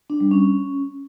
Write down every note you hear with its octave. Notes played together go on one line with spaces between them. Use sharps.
D4
G3
C#4